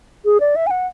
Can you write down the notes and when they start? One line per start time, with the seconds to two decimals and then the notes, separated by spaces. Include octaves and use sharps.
0.25 G#4
0.40 D5
0.56 E5
0.67 G#5
0.70 F#5